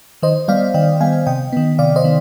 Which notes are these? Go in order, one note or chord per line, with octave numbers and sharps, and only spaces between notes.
D#3 C5 D#5
G3 B3 D5 F5
D#3 D#5 G5
G3 B3 F5 G#5
C3 D#5 G5
D#3 B3
C3 D5 F5
C5 D#5
D#3 B3